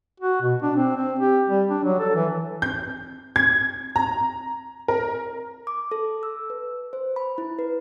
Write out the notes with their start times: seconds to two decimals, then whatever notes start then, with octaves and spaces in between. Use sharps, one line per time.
0.20 F#4
0.42 B2
0.62 D4
0.76 C4
0.96 C4
1.19 G4
1.50 G3
1.70 D4
1.84 F#3
2.00 A4
2.15 E3
2.62 G6
3.36 G#6
3.96 A#5
4.88 A#4
5.67 D6
5.91 A4
6.23 E6
6.50 B4
6.93 C5
7.16 B5
7.38 E4
7.59 B4